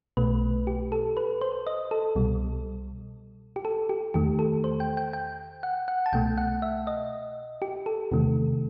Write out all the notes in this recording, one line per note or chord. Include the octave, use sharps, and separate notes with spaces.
B1 B2 A3 B4
G4
A4
B4
C5
D#5
A4
C2 B2 G3
G4
A4
G4
E2 D#3 A3 G4
A4
C5
G5
G5
G5
F#5
F#5
A5
C2 B2 A3 G5
F#5
E5
D#5
G4
A4
E2 C3 D#3 A3